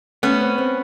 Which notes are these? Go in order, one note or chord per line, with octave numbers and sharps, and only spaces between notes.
A3 B3 C#4
C4
C4